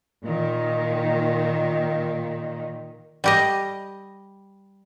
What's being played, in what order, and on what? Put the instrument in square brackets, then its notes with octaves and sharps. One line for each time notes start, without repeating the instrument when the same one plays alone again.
[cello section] A#2 D#3
[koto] G3 G4 D#5